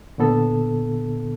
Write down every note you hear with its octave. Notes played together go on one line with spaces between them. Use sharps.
A#2 D3 B3 A4